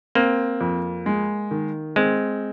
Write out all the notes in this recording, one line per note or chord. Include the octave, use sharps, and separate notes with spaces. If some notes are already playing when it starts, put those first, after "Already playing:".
A#3 C4
F2
G#3
D#3
G#3 C4